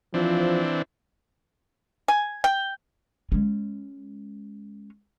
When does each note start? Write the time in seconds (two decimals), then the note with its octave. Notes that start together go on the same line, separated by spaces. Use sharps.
0.14 E3 F3 C4 D4
2.08 G#5
2.44 G5
3.32 G#3 C#4